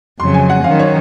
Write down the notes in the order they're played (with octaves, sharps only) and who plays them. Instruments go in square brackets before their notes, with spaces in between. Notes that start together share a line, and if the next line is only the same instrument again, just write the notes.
[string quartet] F2 C#3 F#3 [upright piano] C6
[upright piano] G#5
F#5
[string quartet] D#3 F#3 C#4 [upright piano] F5
[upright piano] C#5